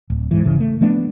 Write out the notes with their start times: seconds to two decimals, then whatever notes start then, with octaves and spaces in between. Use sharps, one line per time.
0.10 D1
0.31 G#2 E3
0.45 G1 C#3 E3
0.60 A3
0.81 F3 A3 B3 D4